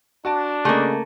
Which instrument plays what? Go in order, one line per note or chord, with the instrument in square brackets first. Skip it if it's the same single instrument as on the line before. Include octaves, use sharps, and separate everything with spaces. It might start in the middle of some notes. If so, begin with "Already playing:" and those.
[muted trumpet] D4 [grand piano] F#4 A5 D7
[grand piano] C#3 G#4 D#5 [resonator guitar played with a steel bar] A3 A#3